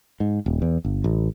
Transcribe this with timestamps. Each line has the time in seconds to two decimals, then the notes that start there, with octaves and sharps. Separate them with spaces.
0.20 G#2
0.46 D#1
0.62 E2
0.84 G1
1.04 A1